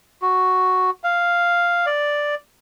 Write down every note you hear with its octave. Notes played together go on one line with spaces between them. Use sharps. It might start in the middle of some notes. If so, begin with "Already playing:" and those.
F#4
F5
D5